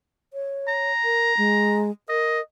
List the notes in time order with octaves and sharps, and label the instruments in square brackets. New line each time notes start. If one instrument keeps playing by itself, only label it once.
[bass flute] C#5
[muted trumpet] A#5
[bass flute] A#4
G#3
[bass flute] A#4 [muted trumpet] D#5